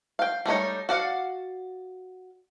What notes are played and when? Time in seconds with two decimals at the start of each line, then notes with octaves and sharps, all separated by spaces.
0.19 F5 G5
0.46 G3 A3 D#4 C#5
0.89 F#4 D5 F5 F#5